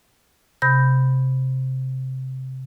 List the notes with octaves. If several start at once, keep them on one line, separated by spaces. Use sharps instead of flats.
C3 B5 G6 A#6